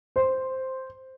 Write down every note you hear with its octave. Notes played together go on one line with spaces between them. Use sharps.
C5